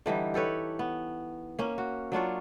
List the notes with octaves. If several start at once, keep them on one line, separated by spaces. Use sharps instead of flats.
D3 E3 G3 D#4
G4 A4 B4 C#5
B3
A#3 C#4
F#4
F#3 D4 F4 C#5